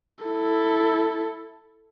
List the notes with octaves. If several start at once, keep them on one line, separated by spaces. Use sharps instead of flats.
E4 A4